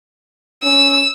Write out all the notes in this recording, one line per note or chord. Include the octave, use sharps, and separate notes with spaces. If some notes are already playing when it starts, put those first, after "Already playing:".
C#4 E6